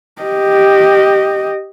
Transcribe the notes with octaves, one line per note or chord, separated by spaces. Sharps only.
G4 D#5